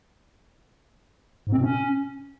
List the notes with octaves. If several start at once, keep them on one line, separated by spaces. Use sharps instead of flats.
G#2
C4
B2
C#4